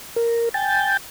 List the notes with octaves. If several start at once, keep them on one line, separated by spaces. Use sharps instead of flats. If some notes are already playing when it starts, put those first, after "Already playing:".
A#4
G5 G#5 G6 A6